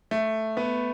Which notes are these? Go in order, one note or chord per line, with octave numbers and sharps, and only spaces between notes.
A3
B3